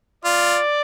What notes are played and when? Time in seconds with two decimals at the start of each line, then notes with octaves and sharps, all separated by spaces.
0.25 F4 D5